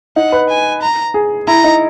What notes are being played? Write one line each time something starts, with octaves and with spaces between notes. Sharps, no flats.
D#4 F#5
B4
G#5
A#5
G#4
E4 A#5
D#4